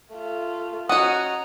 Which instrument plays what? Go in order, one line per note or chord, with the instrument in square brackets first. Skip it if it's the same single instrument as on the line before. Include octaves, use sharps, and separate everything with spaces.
[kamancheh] A3 F4
[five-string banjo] C#4 F#4 [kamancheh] D#5 A#5 [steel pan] F#5 D#6